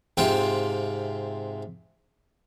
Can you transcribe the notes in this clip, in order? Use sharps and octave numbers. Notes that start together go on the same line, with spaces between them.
G#2 C3 F4 E5 G5 C6